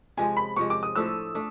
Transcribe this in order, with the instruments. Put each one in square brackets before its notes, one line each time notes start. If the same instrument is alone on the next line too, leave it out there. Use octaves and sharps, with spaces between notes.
[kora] C3 F3 G#3 [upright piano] G#5
[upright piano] B5
[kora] C3 F3 G#3 [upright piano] C#6
[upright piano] D6
D#6
[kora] A2 F3 A3 D4 [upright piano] E6
[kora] A3 D4